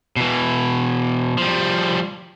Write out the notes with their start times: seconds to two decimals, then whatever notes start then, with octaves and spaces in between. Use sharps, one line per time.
0.16 B2 E3
1.38 F3 G3